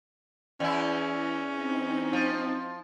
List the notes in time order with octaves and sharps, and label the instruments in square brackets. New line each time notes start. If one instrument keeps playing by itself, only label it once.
[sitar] E2 E4 [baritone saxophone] C#4
[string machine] C4 D#4
[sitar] F3